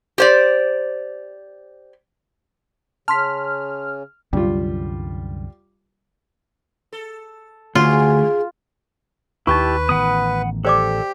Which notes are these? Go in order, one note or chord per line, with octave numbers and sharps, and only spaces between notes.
G4 C5 D5
C#3 A5 C6 F6 B6
C2 F#2 D3 G3 F4
A4
D2 C3 D#4 F4 G#4
D#2 D#4 E4 G4 B4 A5 C#6
A1 D#3 B3 F#5 B5 D#6
G4 A4 C5 D5 D6